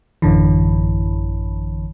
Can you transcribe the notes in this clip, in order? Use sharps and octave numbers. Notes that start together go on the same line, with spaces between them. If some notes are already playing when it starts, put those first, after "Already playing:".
A1 F#2 D3 E3